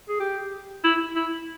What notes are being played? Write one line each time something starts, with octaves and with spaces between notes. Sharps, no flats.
G#4
G4
E4
E4